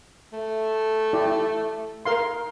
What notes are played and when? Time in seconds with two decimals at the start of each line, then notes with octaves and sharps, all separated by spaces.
0.33 A3
1.13 E4 G4 D5
2.05 A#4 F5 C6